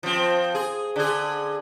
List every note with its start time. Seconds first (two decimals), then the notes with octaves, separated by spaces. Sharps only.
0.03 F3 C4
0.55 G#4
0.96 D3 G#4